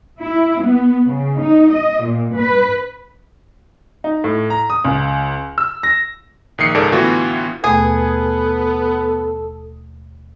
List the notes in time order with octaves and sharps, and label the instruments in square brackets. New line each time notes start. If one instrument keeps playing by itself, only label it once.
[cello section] E4
B3
C#3
D#4
D#5
A#2
B4
[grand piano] D#4
A2
A#5
D#6
C#2
E6
A#6
[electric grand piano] A#1 D#3 D#6 C7 C#7
C#2 G#2 A4 A#4 D5
A2 D3 E3 B3 F4 F#4
[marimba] D#2 B2 A3 [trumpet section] B3 [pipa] G#4 [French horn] A4